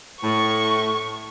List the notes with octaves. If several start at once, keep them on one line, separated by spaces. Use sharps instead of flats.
A2 C#6